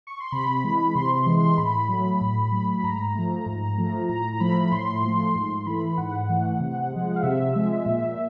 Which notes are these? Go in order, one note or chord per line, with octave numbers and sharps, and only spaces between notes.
C#6
C6
C3 B5
E3 G#3
C3 C6
C6
E3 G#3
C6
A2 B5
F#3 A3
A2
F#3 A3
G#2 A#5
F3 A3
G#2
F3 A3
A2 A#5
A#5
F3 A3 B5
A2 C6
F3 A3
G#2 C6
C6
E3 A3 B5
G#2 F#5
E3 A3
C3
F3 G#3
F5
C3 E5
F3 G#3
A#2